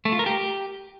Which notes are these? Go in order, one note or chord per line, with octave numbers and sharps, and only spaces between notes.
A3
F4
A#4
G4